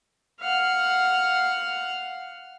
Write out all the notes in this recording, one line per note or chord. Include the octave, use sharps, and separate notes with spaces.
F5 F#5